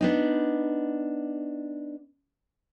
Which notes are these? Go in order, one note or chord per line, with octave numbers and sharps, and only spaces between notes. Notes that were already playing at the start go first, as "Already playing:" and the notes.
B3 D4 D#4